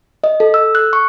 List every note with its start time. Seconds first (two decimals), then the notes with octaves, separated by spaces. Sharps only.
0.24 D#5
0.40 A4
0.54 E6
0.75 F#6
0.93 C#6